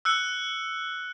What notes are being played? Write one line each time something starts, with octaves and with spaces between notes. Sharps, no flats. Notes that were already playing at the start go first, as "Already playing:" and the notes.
E6 F#6 C#7